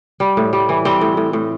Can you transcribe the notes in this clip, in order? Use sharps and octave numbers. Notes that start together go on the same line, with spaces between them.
G3
A2
G3
E3
G3 C4
A2
A2
A2